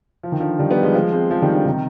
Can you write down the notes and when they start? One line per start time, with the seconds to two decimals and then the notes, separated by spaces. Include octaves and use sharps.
0.23 F3
0.32 D#3
0.40 D3 F3
0.59 D#3 G3
0.71 G3 B3
0.83 F3 G#3
0.94 F3 G#3
1.12 G#3 C4
1.30 F3 G#3
1.42 D#3 G3
1.54 D3 F3
1.66 C3 D#3